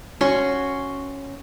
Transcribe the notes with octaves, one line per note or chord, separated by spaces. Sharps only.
C#4 F#4 C6 C#6